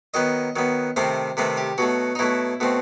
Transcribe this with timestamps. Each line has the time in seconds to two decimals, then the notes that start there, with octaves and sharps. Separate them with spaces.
0.14 D#3 F#3 B3 D#5
0.56 D#3 F#3 B3
0.96 C3 D#3 A3 C4 C5
1.37 C3 D#3 A3 C4 B4
1.57 G4
1.78 B2 F#3 A3 F#4
2.15 D#4
2.19 B2 F#3 A3 E4
2.60 B2 A3 C4